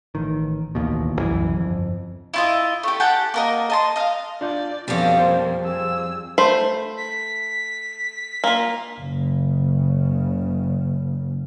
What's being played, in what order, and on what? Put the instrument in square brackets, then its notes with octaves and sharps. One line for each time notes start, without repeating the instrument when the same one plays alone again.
[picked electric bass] A1 D#3
D1 A1 D#2 B2
C2 F#2 E3
G1 F2
[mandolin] E4 F4 D#5
A3 G4
G4 F#5 G5 A5
A#3 A#4 D#5
D#5 A5 C6
D#5 F5
[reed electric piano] D4 F4 G6 [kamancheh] D5
[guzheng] F2 G3 [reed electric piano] B2 B3 [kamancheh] C#4 D5
[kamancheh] A#3 [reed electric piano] C5
[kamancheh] G#4 E6
[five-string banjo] A3 C5 B5
[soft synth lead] B6
[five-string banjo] A#3 F4
[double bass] F#1 C#3